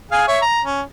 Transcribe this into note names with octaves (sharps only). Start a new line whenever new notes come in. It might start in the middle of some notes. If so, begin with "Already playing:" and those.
G#4 F5 G#5
C#5 E5
A#5
C#4